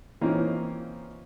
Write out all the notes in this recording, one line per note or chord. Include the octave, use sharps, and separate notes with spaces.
E3 A#3 C4 C#4 D#4 F4